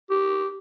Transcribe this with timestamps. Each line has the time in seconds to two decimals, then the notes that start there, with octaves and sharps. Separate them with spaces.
0.10 G4